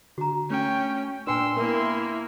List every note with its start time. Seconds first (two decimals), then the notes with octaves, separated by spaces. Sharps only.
0.18 D3 F#4 A#5
0.50 A3 C#4 G5
1.27 A#2 D4 B4 G5 G#5 C6 E6
1.57 A#3 B3 E4 A#4 E5